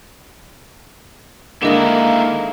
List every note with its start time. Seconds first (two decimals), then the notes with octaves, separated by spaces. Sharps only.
1.63 D3 D#3 G#3 A#3 D4 E4 A#4 D#6